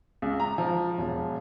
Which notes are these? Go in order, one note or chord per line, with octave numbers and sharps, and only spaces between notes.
C#2
A#5
F3
E1